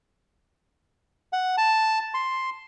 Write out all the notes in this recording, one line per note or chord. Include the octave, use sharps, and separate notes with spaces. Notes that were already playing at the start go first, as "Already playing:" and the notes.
F#5
A5
C6